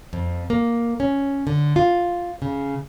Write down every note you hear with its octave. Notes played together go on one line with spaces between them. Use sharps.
F2
A#3
C#4
D3
F4
C#3